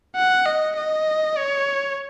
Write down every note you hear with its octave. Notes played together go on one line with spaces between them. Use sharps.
F#5
D#5
D#5
C#5